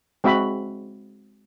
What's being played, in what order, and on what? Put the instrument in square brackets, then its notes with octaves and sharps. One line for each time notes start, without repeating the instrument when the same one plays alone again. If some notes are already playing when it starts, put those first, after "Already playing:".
[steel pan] G#3 C4 F#4 E5 B5